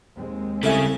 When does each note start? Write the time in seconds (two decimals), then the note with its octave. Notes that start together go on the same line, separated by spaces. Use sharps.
0.16 D#2 G#3 C4
0.63 C2 C#3 G#4 A4 E5